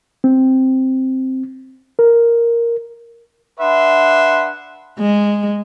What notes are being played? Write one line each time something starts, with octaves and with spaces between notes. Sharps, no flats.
C4
A#4
D4 B4 E5 F#5 C6
G#3